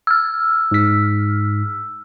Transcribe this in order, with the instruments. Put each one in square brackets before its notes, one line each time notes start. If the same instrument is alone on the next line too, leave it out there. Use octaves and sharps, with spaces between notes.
[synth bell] E6 F6
[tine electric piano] G#2 B6